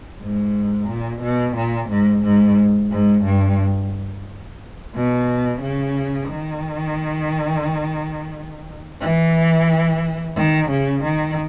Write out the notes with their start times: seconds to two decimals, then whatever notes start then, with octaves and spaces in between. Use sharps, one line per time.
0.20 G#2
0.88 A#2
1.21 B2
1.56 A#2
1.89 G#2
2.23 G#2
2.91 G#2
3.24 G2
4.95 B2
5.61 C#3
6.30 D#3
9.01 E3
10.36 D#3
10.69 C#3
11.03 D#3